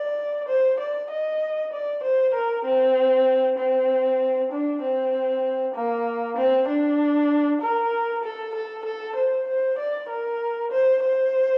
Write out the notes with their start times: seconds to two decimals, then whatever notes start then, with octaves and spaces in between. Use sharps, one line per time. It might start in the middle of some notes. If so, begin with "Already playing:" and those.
Already playing: D5
0.48 C5
0.80 D5
1.10 D#5
1.73 D5
2.03 C5
2.34 A#4
2.65 C4
3.58 C4
4.52 D4
4.82 C4
5.75 A#3
6.37 C4
6.68 D4
7.62 A#4
8.23 A4
8.55 A4
8.85 A4
9.16 C5
9.48 C5
9.79 D5
10.09 A#4
10.71 C5
11.03 C5